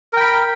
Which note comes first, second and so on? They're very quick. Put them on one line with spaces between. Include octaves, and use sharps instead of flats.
A#4 G5 B5